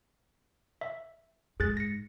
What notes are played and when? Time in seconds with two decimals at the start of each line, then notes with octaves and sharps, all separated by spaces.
0.81 E5
1.60 G#2 G#4 F#6 A6
1.77 A#6 C#7